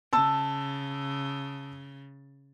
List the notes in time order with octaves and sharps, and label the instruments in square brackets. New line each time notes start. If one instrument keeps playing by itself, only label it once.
[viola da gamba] C#3 [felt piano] A5 E6